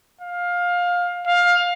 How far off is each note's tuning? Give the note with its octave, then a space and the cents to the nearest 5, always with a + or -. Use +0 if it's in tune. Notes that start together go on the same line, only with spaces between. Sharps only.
F5 +20
F5 +20